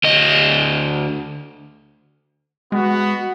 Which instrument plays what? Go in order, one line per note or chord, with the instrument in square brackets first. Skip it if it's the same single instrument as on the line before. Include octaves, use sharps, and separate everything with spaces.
[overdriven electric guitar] D2 D#5
[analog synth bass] G#3 [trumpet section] B3 F#4